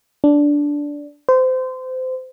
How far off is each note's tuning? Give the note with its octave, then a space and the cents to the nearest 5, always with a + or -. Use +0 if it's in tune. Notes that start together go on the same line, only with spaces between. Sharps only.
D4 -10
C5 -25